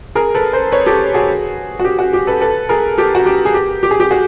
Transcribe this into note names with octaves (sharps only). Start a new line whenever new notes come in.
G#4 A#4
A4 B4
A#4 C5
B4 C#5
G4 A4
F#4 G#4
F#4
G4
F#4
G4
A4 B4
A4 B4
G#4 A#4
G4 A4
F#4
G4
G#4
G4
G4
G#4
G4
F#4 G#4